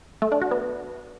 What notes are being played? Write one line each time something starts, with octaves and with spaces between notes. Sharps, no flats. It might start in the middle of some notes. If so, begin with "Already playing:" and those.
A3
D4
F#4
B3